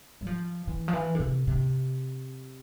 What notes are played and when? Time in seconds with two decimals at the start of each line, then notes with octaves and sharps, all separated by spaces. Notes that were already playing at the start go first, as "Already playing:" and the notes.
0.21 G3
0.27 F3
0.67 E3
0.88 F3
0.93 E3
1.15 D3
1.20 C3
1.47 C3